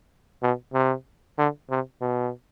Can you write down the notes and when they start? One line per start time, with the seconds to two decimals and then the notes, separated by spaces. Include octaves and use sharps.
0.43 B2
0.74 C3
1.38 D3
1.70 C3
2.01 B2